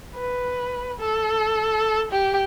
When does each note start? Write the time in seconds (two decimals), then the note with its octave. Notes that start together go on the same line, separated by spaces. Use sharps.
0.15 B4
1.00 A4
2.11 G4